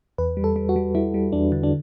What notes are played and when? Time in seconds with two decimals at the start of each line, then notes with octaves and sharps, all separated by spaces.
0.18 E2 B4
0.37 G3
0.44 A4
0.56 G3
0.69 F#4
0.76 G3
0.95 G3 E4
1.14 G3
1.32 E2 D4
1.52 D3
1.63 D4